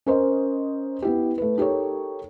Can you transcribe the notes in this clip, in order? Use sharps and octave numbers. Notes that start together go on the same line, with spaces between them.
C#4 A#4 C5 D#5
B3 E4 G4
A3 B4
D#4 G4 A4 A#4 C#5